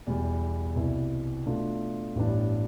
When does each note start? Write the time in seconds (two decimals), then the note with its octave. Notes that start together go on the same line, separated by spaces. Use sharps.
0.07 E2 B2 G3
0.75 C2 B2 B3 E4
1.46 B2 A3 D4 F4
2.15 A1 G2 E3 B3 D4